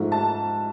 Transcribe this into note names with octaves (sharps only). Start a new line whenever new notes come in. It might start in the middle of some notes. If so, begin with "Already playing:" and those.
Already playing: G#2 F3 A3
A5